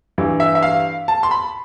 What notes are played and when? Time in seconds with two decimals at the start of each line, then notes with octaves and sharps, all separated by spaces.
0.18 G2 E3
0.40 E5
0.55 E5
0.63 F5
1.08 A5
1.23 C6
1.31 B5